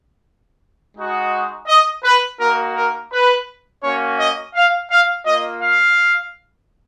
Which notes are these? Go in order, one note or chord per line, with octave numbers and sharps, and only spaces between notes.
G#3 D#4 F#4
D#5
B4
A#3 D#4 F#4 A#4
A#4
B4
A#3 C#4 F#4 C#5
D#5
F5
F5
A#3 F4 D#5
F5